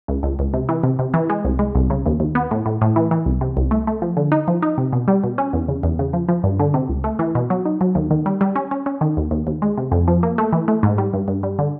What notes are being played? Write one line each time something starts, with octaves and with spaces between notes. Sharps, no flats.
C#2
C#2
C#2
C3
E3
C3
C3
E3
G#3
C2
G#3
C2
C#3
D#2
D#2
B3
A2
A2
A2
E3
E3
C2
C3
C2
A3
A3
F3
D3
D#4
F3
D#4
C3
B2
G3
B2
C#4
E2
C#3
E2
C#3
F3
F3
G2
D3
C3
C#2
A3
E3
B2
F#3
D#4
F#3
D#2
D#3
G3
G3
C#4
C#4
C#4
D#3
D#2
D#2
D#2
G#3
C3
F2
F3
A#3
A3
E3
A3
G#2
G3
G2
G2
G3
D3